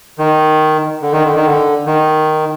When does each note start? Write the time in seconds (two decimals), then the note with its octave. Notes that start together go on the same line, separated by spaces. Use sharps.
0.19 D#3
1.02 D3
1.12 D#3
1.24 D3
1.35 D#3
1.46 D3
1.86 D#3